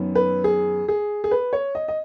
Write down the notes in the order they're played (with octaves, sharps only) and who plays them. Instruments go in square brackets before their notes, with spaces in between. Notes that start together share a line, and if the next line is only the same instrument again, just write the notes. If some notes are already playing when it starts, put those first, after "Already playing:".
Already playing: [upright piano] F#2 D#3 F#3 B3
B4
G#4
G#4
G#4
B4
C#5
D#5
D#5